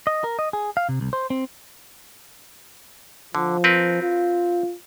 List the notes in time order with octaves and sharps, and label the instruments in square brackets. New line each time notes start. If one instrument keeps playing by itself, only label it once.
[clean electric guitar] D#5
A#4
D#5
G#4
F5
C3
C2
C5
C4
[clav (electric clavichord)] D3 [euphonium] F3
[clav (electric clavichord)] C4 A#4 B4
[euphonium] F4